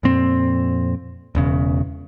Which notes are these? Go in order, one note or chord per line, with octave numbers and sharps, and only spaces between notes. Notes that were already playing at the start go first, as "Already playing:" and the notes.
F2 A#2 C4
E1 E2 C#3